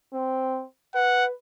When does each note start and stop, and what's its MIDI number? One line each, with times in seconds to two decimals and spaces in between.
0.13 0.63 60
0.95 1.32 71
0.95 1.25 78